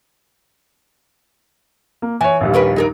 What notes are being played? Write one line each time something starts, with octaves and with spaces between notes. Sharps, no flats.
A#3
E3 C#5 G#5
A#1 D#2 G3
C#4 A#4 B4
D#4 G#4 A#4